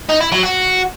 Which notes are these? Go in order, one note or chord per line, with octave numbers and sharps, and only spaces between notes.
D#4
E4
F#3
F#4